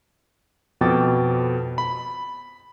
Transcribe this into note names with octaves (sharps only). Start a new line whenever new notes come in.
F2 B2 G5 D6 A6
B5